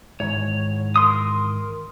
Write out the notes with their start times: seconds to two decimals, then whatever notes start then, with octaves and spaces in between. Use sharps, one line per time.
0.20 G#2 D#3 E3 C#5
0.96 A#4 C6 D#6